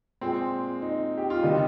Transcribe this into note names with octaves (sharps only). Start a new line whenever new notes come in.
A#2 G#3 C4
D#4
G4
F4
C3 D#3 G3 D#4